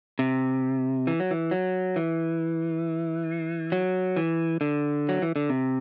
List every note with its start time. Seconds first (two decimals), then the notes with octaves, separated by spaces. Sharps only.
0.19 C3
1.07 E3
1.20 F#3
1.31 E3
1.51 F#3
1.96 E3
3.72 F#3
4.17 E3
4.61 D3
5.09 F#3
5.22 E3
5.36 D3
5.49 C3